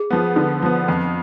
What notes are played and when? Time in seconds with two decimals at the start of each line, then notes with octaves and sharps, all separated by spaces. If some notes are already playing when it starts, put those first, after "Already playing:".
Already playing: G#4
0.10 F3 B3
0.36 D3
0.62 F3 B3
0.88 F2